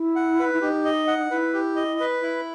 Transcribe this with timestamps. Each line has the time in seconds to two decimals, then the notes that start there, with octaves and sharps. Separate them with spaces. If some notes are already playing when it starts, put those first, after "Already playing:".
Already playing: E4
0.16 F#5
0.39 B4
0.54 E4
0.61 D#4 G4
0.85 D#5
1.07 F#5
1.31 E4 B4
1.54 G4
1.76 D#5
2.00 B4
2.22 E4